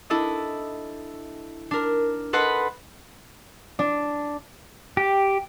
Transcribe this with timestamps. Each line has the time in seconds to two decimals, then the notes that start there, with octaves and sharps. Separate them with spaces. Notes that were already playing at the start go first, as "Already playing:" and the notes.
0.10 D4 E4 A4 D#5
1.71 D4 A#4
2.33 A4 B4 D#5 F#5 B5 C6
3.79 D4
4.97 G4